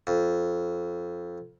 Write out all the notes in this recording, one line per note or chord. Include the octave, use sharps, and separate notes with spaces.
F2